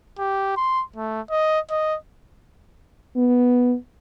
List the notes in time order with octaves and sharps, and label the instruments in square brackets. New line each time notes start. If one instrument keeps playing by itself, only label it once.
[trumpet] G4
C6
A3
D#5
D#5
[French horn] B3